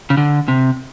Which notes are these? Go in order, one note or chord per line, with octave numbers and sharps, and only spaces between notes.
C#3
D3
C3